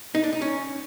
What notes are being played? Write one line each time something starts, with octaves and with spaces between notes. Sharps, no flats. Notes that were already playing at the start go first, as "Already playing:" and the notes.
D#4
D4
D#4
C#4